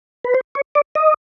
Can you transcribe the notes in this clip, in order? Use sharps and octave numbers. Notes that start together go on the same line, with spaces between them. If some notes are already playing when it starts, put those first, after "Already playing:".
B4
C5
C#5
D5
D#5